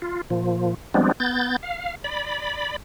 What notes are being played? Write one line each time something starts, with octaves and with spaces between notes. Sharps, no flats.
F4
A#2 F3
F3 G3 G#3 B3 C4 D4
B3 G6 A6
F5
D5 B5